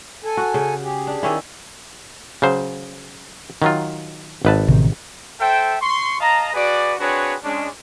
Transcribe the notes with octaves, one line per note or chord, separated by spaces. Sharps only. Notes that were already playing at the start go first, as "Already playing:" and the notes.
A4 G#5
F#4
C#3
G4 G#4
D4
D#3 C#4 E4
C#3 F#3 C5
D#3 F#3 F4
G#1 B4 A5
A1 C3 D#3
A4 C5 E5 G5
C6 C#6
D#5 F5 A5 A#5
F#4 G#4 B4 D5
C4 D4 F#4 G#4 B4 C#5
G#3 C#4 D4